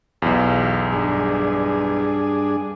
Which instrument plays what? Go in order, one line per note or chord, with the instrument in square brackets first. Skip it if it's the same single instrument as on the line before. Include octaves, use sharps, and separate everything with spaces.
[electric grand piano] B1 E2 [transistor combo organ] G4 F5
[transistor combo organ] G2 D4 G#4